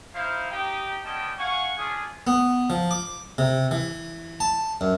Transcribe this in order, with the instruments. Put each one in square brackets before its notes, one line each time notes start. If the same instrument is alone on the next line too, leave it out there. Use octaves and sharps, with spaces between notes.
[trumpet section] D#4 E4 C5 F5
D#4 G4 G5
G3 B3 C#4 D#5 G5 A5
F5 F#5 G#5 C#6
C#4 D4 F4 G#4
[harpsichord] B3
F3
D6
C3
E3
A5
F#2